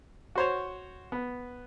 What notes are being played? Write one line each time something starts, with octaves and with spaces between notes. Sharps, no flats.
F#4 C5 C#5
B3